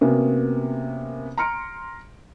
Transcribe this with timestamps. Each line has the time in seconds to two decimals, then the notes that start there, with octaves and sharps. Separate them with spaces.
0.01 C3 A#3 B3 C#4 F#4
1.37 A#5 C6 F6 C#7 D7